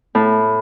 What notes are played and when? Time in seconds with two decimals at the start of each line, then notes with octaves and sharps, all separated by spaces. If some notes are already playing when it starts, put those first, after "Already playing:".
0.15 A2